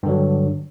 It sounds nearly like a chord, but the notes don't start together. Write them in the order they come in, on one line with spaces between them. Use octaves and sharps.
G2 D3 F#3